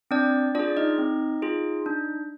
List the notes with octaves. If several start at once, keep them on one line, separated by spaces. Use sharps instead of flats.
C4 D4 D5
D4 F4 G#4 D5
D#4 D#5
C4
F4 G#4
D4